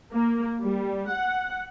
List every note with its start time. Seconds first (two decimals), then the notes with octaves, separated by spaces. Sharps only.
0.12 A#3
0.64 G3
1.11 F#5